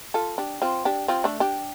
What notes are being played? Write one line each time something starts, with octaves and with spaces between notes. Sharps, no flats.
F4 A4
D4 G4
C4 F4
D4 G4
C4 F4
A3 D4
D4 G4